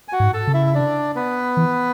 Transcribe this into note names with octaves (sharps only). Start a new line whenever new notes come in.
G#5
F#4 F#5
G#2
A4 A5
C#3
E4 E5
E5
D4 D5
B3 B4
E3